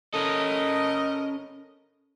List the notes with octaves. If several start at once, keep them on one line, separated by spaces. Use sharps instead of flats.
A3 C#4 A4 A#4 D#5